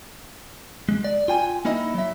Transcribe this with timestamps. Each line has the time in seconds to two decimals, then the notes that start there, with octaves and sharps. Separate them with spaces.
0.89 G#3
1.04 D5
1.28 F4 G5 G#5
1.65 A#3 D#4 E4 D#5
1.94 F#3 E5